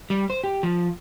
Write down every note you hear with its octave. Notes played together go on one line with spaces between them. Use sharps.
G3
C5
G4
F3